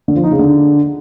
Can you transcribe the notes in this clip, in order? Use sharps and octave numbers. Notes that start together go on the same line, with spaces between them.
D3
F3
D#4
C#3
D3